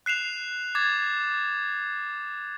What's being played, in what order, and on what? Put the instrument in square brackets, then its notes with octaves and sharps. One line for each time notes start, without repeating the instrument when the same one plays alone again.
[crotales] F#6 C7 E7 F7
D6 G#6 A6